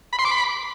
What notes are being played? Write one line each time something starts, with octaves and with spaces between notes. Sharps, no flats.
B5
C6
D6
B5